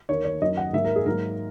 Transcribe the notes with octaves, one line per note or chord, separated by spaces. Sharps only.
D#2 D#3 A#3 C#5
C#5
F#2 D#3 F#3 D#5
F#5
G#2 F#3 A#3 E5
A#4
G#4
G#2 F#3 A#3 A#4